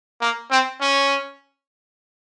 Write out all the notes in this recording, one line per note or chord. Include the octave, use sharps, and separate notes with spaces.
A#3
C4
C#4